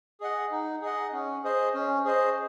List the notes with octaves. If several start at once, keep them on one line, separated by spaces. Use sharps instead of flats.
G#4 D#5 F#5
D#4
G#4 D#5 F#5
C#4
G#4 C5 D#5
C#4
G#4 C5 D#5